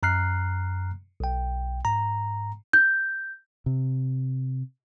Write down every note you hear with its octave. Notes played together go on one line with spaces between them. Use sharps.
F#2 A#5 F6 F#6 C7
B1 G5
G#2 A#5
G6
C3